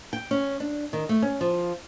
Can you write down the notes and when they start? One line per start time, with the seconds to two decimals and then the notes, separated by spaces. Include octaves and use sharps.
0.13 G5
0.31 C#4
0.60 D4
0.93 D#3
1.09 A3
1.22 C#4
1.41 F3